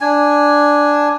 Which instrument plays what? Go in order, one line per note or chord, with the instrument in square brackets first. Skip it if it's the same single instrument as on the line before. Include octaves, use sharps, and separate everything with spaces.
[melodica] D4 G#5